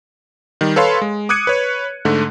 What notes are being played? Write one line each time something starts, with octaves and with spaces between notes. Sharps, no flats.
D#3 G3
A4 B4 C#5 F5 B5 C6
G#3
D6 D#6 F#6 G#6 C#7 D#7
B4 C#5
G#2 D3 A3